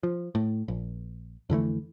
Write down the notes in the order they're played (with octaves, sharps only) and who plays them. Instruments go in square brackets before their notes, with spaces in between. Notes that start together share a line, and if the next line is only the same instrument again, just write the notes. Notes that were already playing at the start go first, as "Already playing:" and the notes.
[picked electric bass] F3
A2
A#1
F2 D3 E3 A3